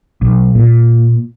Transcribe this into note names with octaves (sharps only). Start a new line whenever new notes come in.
B1
A#2